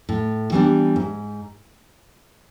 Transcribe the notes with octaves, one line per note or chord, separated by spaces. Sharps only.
A2
E3 G3 B3 D4
G#2